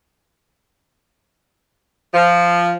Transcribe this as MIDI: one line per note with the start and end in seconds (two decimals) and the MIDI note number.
2.14 2.75 53